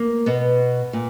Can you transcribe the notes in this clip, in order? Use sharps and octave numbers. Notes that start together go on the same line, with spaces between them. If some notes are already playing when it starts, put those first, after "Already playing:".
Already playing: A#3
B2 B3
A#2